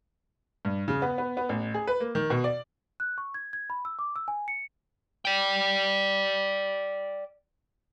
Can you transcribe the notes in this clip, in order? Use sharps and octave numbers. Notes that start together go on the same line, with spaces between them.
G2
C#3
B3
B3
B3
A1
G#4
B4
A#3
D#3
B2
D5
F#6
C#6
G#6
G#6
B5
E6
D6
E6
G#5
C#7
D5 G5